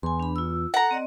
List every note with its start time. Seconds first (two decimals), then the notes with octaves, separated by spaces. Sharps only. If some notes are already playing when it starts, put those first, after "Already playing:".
0.03 E2 G#5 C6
0.20 D4 B5
0.36 F4 E6
0.74 A4 F#5 A#5
0.91 C4 D5 D#5